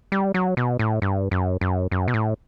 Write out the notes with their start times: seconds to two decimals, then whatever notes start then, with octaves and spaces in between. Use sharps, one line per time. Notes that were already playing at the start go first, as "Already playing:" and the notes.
0.12 G3
0.34 F#3
0.57 B2
0.79 A2
1.02 G2
1.31 F#2
1.61 F#2
1.91 F#2
2.08 B2
2.14 A2